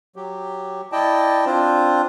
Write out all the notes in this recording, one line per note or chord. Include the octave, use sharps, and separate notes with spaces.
F#3 G4
E4 D5 D#5 G5 A5
C4 D4 F4 C5